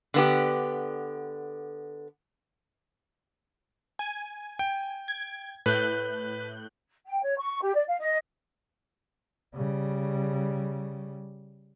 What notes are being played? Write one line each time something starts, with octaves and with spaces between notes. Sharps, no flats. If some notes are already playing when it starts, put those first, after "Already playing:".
D3 B3 G4
G#5
G5
G#6
A2 B4 F#6 G6
G5
C#5
C#6
G4
D5
F5
D#5
C#3 G3